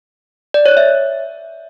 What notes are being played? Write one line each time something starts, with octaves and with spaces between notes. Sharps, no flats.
D5
C#5
E5